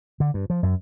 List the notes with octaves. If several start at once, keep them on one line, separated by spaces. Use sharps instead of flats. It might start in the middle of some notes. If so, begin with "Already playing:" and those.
D3
G2
F3
F#2